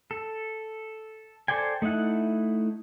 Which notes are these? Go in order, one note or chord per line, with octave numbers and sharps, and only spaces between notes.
A4
A4 C5 D5 G5 G#5
A3 D#4 E4 F#5